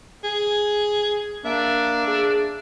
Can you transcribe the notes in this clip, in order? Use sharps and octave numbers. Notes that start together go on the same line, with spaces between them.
G#4
A#3 D4 E5
G#4